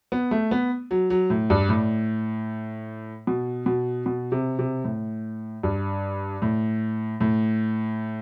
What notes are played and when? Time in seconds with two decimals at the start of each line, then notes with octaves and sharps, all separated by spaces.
0.12 B3
0.31 A3
0.51 B3
0.91 F#3
1.10 F#3
1.30 A2
1.50 G2
1.69 A2
3.27 B2
3.66 B2
4.06 B2
4.32 C3
4.59 C3
4.84 A2
5.63 G2
6.42 A2
7.21 A2